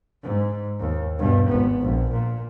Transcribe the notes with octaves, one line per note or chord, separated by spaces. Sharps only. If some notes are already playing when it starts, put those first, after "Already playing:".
G#2
D#2
G2 B2
G#1 B3
A#1
A#2